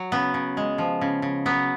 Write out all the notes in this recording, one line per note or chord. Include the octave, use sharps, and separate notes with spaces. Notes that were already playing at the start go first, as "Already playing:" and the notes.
Already playing: F#3
C#3 B3
C#3
G#3
F3
C#3
C#3
F#3 B3